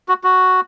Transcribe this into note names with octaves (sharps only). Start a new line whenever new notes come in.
F#4
F#4